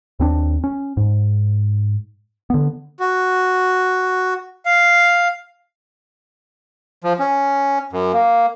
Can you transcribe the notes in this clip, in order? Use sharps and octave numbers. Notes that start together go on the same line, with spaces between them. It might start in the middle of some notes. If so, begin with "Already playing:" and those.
D#2 C4 D4
C#4
G#2
D3 B3
F#4
F5
F3
C#4
F#2
A#3